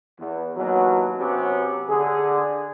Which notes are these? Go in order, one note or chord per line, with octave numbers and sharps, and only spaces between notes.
E2
D#2 B2 E3 F#3
C3 F#3 B3 C#4 G4
D3 G#4